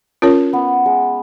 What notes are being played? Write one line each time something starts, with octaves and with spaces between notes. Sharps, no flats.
C#4 F4 A#4 C#5
B3
G#3